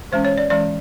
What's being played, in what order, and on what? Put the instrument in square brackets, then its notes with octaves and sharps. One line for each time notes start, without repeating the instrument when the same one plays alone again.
[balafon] E3 G#3 C#4 C5
C#5
D5
E3 G#3 C#4 D5